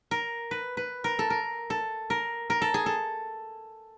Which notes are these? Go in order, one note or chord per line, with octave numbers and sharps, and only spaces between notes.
A#4
B4
B4
A#4
A4
A#4
A4
A#4
A#4
A4
G#4
A4